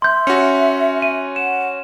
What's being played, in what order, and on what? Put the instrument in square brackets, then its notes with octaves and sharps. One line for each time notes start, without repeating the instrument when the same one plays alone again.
[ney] E5 [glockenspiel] C6 G6
[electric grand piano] C#4 F#4 [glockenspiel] C#7
[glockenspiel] D#7
[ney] F#5 [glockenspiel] E7